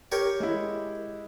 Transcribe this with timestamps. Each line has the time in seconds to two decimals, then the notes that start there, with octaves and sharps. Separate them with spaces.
0.12 G4 A#4 C#5
0.40 G#3 E4